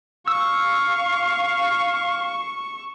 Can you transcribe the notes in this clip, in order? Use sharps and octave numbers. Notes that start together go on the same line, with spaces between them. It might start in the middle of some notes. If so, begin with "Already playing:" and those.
F5 C#6 E6